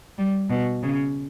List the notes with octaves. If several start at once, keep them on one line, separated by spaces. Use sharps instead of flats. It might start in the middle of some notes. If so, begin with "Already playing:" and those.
G3
B2
C#3